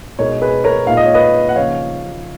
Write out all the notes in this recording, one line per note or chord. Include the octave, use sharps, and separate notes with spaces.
B2 G#3 D#4 A#4 C#5
G#4 B4
A#4 C#5
A#2 G#3 D#4 F5
D#5
C#5
B4 D#5
F#5
D#2 C#3 F3 C#5 F5